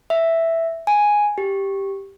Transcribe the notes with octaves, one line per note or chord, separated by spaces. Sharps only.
E5
G#5
G4